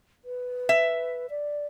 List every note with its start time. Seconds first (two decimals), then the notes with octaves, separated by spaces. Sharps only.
0.25 B4
0.69 E5
1.30 D5